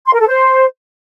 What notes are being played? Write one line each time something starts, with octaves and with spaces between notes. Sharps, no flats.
C6
A#4
A4
C5